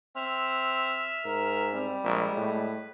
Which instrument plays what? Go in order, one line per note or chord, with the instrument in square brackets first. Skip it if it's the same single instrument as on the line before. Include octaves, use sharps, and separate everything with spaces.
[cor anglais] C4 [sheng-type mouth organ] E5 F6
[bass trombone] G#2 [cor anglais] A#4
[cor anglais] G3 [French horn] C4
[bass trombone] A#1 [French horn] G#3 [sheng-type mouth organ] A#4 E5
[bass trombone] A2 [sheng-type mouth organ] B4